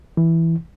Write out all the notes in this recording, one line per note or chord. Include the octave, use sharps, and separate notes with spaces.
E3